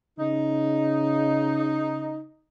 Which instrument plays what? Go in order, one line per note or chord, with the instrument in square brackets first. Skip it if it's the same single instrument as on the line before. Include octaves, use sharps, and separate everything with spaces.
[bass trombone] C#3 [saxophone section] D#4